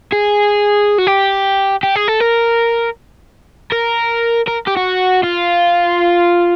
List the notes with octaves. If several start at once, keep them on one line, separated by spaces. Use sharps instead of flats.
G#4
F#4
G4
G4
G#4
A4
A#4
A#4
A#4
G4
F#4
F4